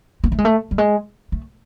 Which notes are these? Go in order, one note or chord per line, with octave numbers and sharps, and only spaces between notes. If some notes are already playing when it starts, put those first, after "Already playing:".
A#3
A3
G#3
A3
G3
G#3
A3